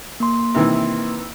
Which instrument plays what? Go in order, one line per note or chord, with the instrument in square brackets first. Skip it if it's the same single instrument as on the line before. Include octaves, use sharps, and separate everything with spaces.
[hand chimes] A#3 C6
[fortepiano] C3 D#3 E3